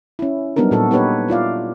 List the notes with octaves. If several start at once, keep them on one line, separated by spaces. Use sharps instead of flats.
C#4 E4
F#3 G3 B3 D4 D#4 A#4
A#2 F#4 A4
B3 D#4 G4 B4 C#5
E4 F4 D5 F5